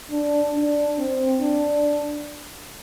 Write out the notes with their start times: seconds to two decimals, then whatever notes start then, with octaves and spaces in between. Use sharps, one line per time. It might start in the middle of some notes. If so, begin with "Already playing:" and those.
0.11 D4
0.54 D4
0.98 C4
1.41 D4